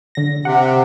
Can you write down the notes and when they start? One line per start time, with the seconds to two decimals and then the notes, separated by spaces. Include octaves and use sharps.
0.15 D3 A#6
0.45 C3 F#5